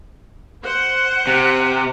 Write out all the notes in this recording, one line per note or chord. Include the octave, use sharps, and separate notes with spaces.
C5 F#5
C3